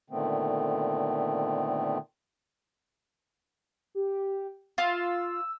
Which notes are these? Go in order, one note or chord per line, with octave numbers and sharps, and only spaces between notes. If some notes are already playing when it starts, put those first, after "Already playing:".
A#2 D3 D#3 A3 B3 C4
G4
F4 E6